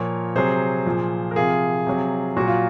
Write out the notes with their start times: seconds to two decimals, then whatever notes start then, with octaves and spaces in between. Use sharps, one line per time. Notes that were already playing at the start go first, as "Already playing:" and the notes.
Already playing: A#2 F3 A#4 C#5
0.35 C3 F#3 G#4 C5
0.86 A#2 F3
1.31 A#4
1.36 C3 F3 F4 G#4
1.86 C3 F#3
2.36 A#2 F#3 F#4
2.48 F4